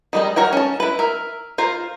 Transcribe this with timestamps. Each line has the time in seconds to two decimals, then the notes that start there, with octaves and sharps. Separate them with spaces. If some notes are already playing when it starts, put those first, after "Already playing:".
0.13 D#3 G3 G#3 D#4
0.36 F#4 A#4 C#5 G5
0.53 C#4 A5
0.80 E4 B4
0.99 A#4 E5
1.58 F4 A#4 C5